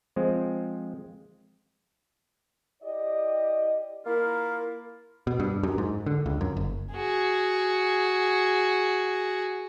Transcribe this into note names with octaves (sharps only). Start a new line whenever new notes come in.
F3 G#3 C4 C5
E4 G4 D5 D#5
A#3 E4 F4 A#4
B2
G2
F#2
G#2
D3
C#2
F#2
F#1
F#4 G#4